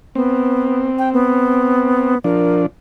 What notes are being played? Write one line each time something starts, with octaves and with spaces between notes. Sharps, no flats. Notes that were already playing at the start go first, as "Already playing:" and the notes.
B3 C4
G5
B3
F3 D4 A#4